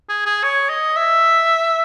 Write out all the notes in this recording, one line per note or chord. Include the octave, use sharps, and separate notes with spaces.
G#4
G#4
C#5
D#5
E5